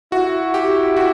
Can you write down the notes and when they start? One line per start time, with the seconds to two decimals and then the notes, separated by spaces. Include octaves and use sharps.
0.12 E4 F#4
0.54 G4
0.97 F#4